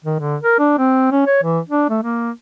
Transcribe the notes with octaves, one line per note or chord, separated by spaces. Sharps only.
D#3
D3
A#4
D4
C4
C#4
C#5
E3
D4
A3
A#3